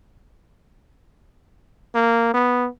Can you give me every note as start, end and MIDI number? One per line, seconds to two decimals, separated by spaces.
1.95 2.29 58
2.34 2.68 59